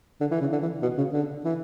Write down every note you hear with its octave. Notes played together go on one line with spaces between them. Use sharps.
D3
E3
C#3
D3
E3
B2
C#3
D3
E3